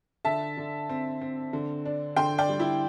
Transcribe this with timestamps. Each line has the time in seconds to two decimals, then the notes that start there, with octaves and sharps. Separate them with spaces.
0.25 D3 E5 A5
0.57 D3
0.89 C4
1.21 C4
1.53 D3
1.85 D4
2.16 D3 G5 C6
2.38 D5 G5
2.49 G3
2.60 E4